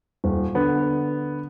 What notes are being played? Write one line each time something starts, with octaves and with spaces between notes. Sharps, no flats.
D#1
D3 B3